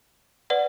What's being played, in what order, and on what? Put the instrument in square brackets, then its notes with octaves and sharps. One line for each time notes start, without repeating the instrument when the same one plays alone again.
[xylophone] B4 D5 F#5